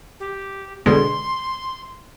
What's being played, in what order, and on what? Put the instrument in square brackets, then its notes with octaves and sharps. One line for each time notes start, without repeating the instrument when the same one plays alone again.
[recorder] G4
[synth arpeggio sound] B2 D3 G#3 [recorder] C6